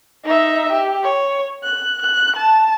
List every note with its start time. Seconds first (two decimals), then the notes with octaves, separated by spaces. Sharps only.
0.24 D#4 E5
0.73 G4
1.03 C#5
1.64 F#6
2.02 F#6
2.36 A5